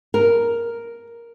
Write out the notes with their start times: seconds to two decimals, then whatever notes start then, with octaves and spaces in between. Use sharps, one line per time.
0.14 A#4